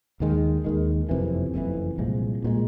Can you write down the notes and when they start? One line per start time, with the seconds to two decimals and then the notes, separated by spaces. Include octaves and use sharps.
0.20 D#2 D#3 G#3
0.64 D#2 D#3 G#3
1.09 F#1 F2 C3 E3
1.54 F#1 F2 C3 E3
1.98 C2 A#2 F3 G#3
2.43 C2 A#2 F3 G#3